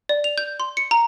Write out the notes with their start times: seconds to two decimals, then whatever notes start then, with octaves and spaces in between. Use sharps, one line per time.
0.09 D5
0.24 F7
0.38 G6
0.60 C6
0.77 C#7
0.91 A#5